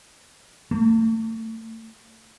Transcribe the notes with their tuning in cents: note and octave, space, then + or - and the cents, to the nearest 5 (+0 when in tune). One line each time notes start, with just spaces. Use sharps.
A3 +35